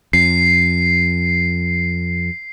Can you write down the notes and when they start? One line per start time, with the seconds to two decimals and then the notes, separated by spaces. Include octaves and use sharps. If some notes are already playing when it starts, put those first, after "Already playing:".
0.13 F2 C7